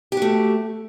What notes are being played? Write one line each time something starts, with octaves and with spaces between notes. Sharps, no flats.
A3 F#4 G4